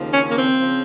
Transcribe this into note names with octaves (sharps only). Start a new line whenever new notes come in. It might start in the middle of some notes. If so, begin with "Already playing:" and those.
Already playing: D#2 C#3 F3
C#4
A#3
C4
C#3 F3